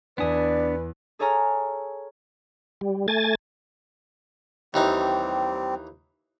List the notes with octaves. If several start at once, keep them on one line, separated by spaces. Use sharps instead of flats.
E2 B3 D4 B4 D5 G#5 D#6 B6
G#4 A4 C#5 G#5 A#5 F6
G3
A3 G#5 A6
D#2 E3 G3 C4 D#4